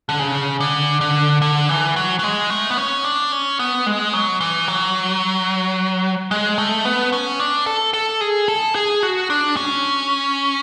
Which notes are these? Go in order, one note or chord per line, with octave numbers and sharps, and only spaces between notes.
D3
C#3
D3
D3
D3
E3
F#3
F#3
G#3
A3
B3
C#4
D4
C#4
B3
G#3
F#3
E3
F#3
G#3
A3
B3
C#4
D4
A4
A4
G#4
A4
G#4
F#4
D4
C#4